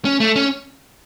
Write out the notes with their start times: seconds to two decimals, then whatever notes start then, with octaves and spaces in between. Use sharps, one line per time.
0.05 C#4
0.20 A3
0.36 C#4